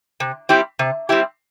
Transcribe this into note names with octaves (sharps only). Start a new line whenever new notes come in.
C3
G3 C4 E4 G4
C3
G3 C4 E4 G4